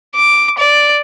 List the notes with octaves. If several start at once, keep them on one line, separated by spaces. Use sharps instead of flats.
D6
D5